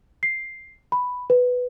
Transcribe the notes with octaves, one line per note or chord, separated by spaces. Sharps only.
C7
B5
B4